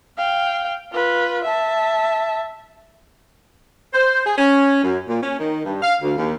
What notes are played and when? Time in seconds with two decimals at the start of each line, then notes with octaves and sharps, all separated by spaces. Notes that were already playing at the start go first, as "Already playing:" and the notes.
0.17 F5 G5
0.93 F4 B4
1.44 E5 A5
3.94 C5
4.26 G#4
4.38 C#4
4.83 F#2
5.07 A#2
5.22 C#4
5.39 D#3
5.65 G2
5.82 F5
6.02 D2
6.17 D#2